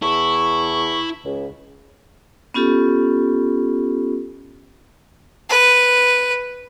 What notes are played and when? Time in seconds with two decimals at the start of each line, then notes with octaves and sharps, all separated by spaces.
0.02 E2 E4 A5 C#6
1.25 C#2
2.54 B3 C#4 F4 G4 A4
5.50 B4